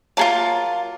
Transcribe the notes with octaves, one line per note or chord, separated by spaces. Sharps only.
F#3 A#3 F4 G#4 A5